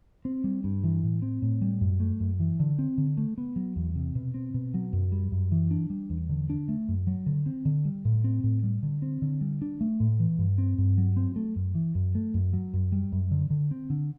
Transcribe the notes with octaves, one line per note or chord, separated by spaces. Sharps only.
C4
G3
G2
E3
A2
C4
A2
G3
F#2
A3
F#2
E3
D3
C4
D3
A3
B3
F#3
E2
C3
B2
C4
B2
F#3
F#2
G3
F#2
E3
D4
G3
E2
D3
D4
A3
F#2
F#3
D3
C4
D3
G3
A2
C4
A2
G3
D3
C4
D3
G3
D4
A3
A2
E3
G2
C4
G2
F#3
C4
A3
F#2
E3
F#2
A3
F#2
F#3
F#2
G3
F#2
D3
D3
C4
D3